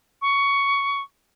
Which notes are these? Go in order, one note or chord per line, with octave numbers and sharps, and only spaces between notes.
C#6